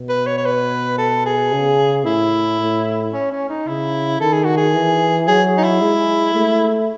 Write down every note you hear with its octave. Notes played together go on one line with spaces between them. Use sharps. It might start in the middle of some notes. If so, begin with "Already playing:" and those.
Already playing: B2
B4
C#5
C#5
B4
A4
G#4
C#3
A2 E4
A2
C#4
C#4
D#4
C#3 E4
D#3 A4
G#4
F#4
G#4
E3
F#3 G#4
D#4
E4
G#3
A3